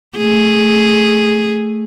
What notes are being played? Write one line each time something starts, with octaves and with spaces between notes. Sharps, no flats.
A3 G#4